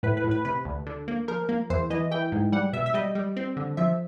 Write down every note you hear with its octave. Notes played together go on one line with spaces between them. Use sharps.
A2 B4
B4
A2
B4
C3 B4
D2
D3
A#3
F3 A#4
A#3
E2 C5
E3 D#5
E3 G5
G#2
G3 F#5
B2 E5
E5
G3 D#5
G3
C4
D3
F3 E5